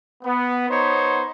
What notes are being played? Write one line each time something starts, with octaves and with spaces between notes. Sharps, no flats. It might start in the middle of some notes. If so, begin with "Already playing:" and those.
B3
B3 D#4 C5 C#5